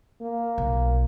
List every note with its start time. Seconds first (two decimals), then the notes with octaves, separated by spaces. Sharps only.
0.22 A#3
0.58 B1